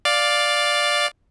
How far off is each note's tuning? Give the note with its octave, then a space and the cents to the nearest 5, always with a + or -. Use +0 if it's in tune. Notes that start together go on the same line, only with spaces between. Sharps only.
D5 +0 F5 +10